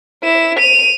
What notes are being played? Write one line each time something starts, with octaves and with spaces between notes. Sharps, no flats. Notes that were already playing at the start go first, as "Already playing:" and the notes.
E4 E7
D#7 F7